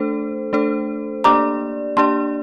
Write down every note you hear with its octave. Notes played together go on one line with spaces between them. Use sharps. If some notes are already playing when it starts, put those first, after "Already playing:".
Already playing: A3 D4 A4 C5
A3 D4 A4 C5
A#3 D4 G4 D5 A#5 D6
A#3 D4 G4 D5 A5 C6